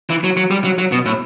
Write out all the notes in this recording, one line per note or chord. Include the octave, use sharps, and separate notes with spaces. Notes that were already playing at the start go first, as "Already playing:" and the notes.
E3
F#3
F#3
G3
F#3
F#3
B2
A2